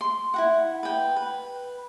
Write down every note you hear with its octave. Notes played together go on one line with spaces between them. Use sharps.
C6
E4 F#4 F#5
B4 G5
B4